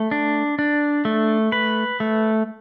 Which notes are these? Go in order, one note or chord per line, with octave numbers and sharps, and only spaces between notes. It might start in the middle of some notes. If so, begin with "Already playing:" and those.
Already playing: A3
D4
D4
A3
B4
A3